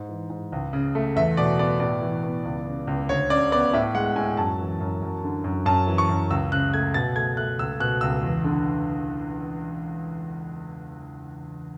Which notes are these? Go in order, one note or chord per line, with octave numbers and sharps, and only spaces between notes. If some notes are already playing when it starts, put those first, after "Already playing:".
Already playing: G#2
E3
G#2
C#2
C#3
A3
E2 E5
B2 D5
B3 D5
A2 D5
E3
B3
C#2
C#3
C#2
D2 C#5
C#3 D5
B3 D5
A2 E5
G#3 F#5
A2 G#5
F#2 A5
E3
F#2
F#2
D3
F#2
F#2 A5
E3
C#6
F#2
C#2 E6
C#3 F#6
A3 G#6
B2 A6
A3 G#6
A3 F#6
C#2 E6
B2 F#6
C#2 E6
E2
D3